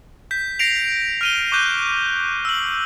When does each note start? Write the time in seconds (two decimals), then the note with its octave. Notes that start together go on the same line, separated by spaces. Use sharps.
0.31 G6 B6
0.59 A#6 C7 D7 F7
1.21 F6 D#7 G7
1.52 C#6 D6 F#6 G6 D#7
2.45 E6 F#7